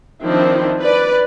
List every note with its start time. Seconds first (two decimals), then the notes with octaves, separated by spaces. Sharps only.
0.22 D#3 F3 C4 D4 E4
0.81 B4 D5